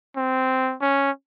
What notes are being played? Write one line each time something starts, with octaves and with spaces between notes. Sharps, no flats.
C4
C#4